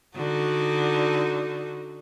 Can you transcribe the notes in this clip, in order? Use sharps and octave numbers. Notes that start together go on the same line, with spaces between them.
D3 D#4 F#4